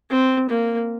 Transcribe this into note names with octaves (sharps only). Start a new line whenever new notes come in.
C4
A#3